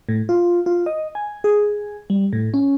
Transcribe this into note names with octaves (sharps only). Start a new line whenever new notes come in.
A2
F4
F4
D#5
G#5
G#4
G3
A2
C#4